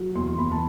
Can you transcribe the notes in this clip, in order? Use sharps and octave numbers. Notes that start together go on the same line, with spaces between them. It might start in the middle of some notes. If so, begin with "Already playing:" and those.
Already playing: F#3
E2 C6
E2 B5
A5